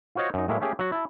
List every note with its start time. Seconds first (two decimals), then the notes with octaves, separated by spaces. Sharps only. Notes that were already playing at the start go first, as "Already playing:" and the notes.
0.15 F4 F#4 C5 C#5 D#5
0.34 F#2 D#4
0.48 A2 F#3 G#3 A#3 E4
0.60 A3 A#3 C#4 G4 G#4
0.79 F#3 F#4
0.92 E4 A5